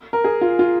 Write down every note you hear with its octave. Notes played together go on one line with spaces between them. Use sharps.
A#4
G#4
F4
F4